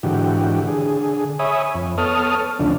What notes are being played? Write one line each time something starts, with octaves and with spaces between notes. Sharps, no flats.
G#2 D3 E3 F#4 G4
D3 G#4
C#5 E5 G#5 B5 D#6
F2
B3 A4 C#5 A5 D#6 F6
D2 C3 F3 C#4 D4